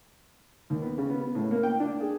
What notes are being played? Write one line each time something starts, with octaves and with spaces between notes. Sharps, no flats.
D#2
B3
C#3
B3
B3
A2
A#3
G5
D4
G#4